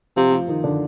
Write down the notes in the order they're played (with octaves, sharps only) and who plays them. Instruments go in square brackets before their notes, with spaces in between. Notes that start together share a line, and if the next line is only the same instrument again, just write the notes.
[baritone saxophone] C3 [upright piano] F3 F4
[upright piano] F3 F4
D#3 D#4
D3 D4